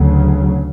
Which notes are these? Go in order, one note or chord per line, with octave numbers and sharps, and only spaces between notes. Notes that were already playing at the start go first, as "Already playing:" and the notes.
Already playing: D2 C#3 F#3